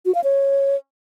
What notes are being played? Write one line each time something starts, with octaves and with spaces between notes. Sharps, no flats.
F#4
F5
C#5